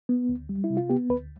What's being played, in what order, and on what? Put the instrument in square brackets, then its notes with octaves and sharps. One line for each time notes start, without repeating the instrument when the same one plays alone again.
[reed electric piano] B3
D2
G3
E4
C3
F4
B3 G4
D2 B4